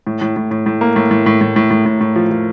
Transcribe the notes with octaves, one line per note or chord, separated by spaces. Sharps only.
A2
A2
A2
A2
A2
A#3
A2
A2
A2
A2
A2
A2
A2
A2
F3
F3